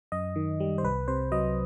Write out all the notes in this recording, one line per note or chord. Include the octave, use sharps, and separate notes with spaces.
F#2 D#5
D#3
G3
C5
C2 B4
C3 C5
F#3 D#5